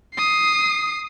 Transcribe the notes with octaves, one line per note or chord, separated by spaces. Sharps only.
D#6 C7